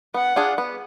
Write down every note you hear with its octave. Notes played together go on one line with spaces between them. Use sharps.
B3 F#5
D4 F4 G#4
B3